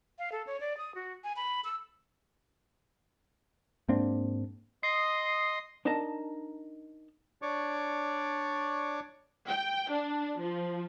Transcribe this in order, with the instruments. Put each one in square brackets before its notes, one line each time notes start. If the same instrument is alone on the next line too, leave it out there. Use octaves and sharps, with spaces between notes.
[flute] F5
A4
C#5
D5
D#6
F#4
G#5
B5
E6
[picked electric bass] G#2 A#3 C4 D4
[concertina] D#5 C6 D#6 [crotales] C7
[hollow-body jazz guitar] D4 D#4 A#4 D#5 A5 A#5
[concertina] D4 C#5 D5 C#6 D6
[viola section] G5
D4
F3